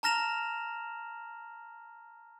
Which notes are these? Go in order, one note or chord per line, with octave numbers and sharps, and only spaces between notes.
A5 A#5 F6 A#6 E7 F7